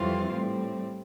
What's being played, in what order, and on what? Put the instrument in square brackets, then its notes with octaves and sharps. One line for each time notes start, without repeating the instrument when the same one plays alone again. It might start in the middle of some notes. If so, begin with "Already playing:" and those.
Already playing: [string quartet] F2 E3 G3 C4 F4
A2 G3 C4